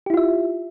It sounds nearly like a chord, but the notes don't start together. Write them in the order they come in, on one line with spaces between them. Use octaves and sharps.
G4 E4 F4 E5